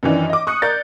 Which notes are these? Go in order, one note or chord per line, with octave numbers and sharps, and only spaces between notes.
F#2 D#3 E3 D4
D#5 D6
C#6 D#6 F#6 C#7
A#4 D5 G6 A6